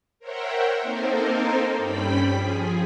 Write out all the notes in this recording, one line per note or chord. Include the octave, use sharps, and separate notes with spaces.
A#4 C5 C#5 E5 F#5 G5
A#3 C4 D#4 A4 A#4 C5
G2 G3 C#4 G5 B5 B6
F3 G#4